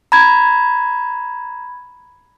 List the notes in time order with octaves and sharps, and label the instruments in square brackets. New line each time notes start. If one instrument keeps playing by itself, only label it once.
[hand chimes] A#5 B5 G#6